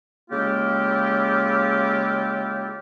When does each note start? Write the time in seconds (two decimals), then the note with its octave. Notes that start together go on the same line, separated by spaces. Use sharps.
0.31 C#3 G#3 A#3 E4 F4 G4